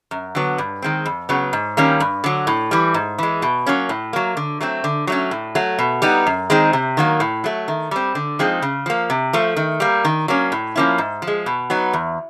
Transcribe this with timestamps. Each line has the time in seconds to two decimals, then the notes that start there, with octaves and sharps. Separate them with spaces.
0.11 F#2
0.35 D3 F#3 B3
0.58 G2
0.82 D#3 G#3 C4
1.06 F2
1.29 C#3 F#3 B3
1.53 G#2
1.77 D#3 G3 A#3 C#4
2.00 G2
2.24 D3 F#3
2.47 A2
2.71 E3 G3
2.94 G#2
3.19 E3 G#3
3.42 B2
3.66 F#3 A#3 C#4
3.89 A2
4.13 F#3 A#3
4.37 D3
4.61 F#3 A3 C4
4.84 D3
5.07 F#3 A3 C#4
5.31 A2
5.55 F#3 A3
5.79 B2
6.02 G3 B3 D#4
6.27 F#2
6.50 D#3 G#3 C4 D#4
6.73 C3
6.97 D#3 F#3 A#3
7.20 A2
7.44 F#3 A3
7.68 D#3
7.91 G3 C4
8.15 D3
8.39 F3 G#3 C4 D#4
8.62 C#3
8.86 F3 A#3
9.10 C3
9.33 F3 A3
9.57 D#3
9.80 G3 A#3
10.05 D#3
10.28 F#3 A#3 C#4
10.52 A2
10.76 F3 A#3 C#4 E4
10.98 G#2
11.22 F3
11.27 G#3
11.46 B2
11.70 F#3 B3 D#4
11.93 E2